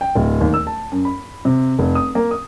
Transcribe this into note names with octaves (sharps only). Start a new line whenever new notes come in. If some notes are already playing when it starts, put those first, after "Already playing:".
G5
D1
D#2
E6
A5
F#2
B5
C3
F1
D#6
A#3
D#6